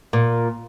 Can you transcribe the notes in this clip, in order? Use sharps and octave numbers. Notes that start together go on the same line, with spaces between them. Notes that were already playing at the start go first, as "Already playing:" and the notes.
A#2